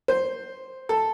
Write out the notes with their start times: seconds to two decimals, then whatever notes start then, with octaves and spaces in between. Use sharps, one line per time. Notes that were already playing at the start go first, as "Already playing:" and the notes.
0.08 C5
0.89 A4